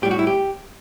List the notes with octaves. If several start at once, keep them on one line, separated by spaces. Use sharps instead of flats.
A2 G3 G4
F#4
E4
G4